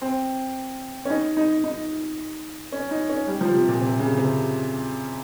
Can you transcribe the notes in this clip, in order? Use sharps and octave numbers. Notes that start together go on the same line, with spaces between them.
C4
C#4
D#4
D#4
D#4
C#4
D#4
C#4
G3
F3
C3
A#2
C3
C#3
C3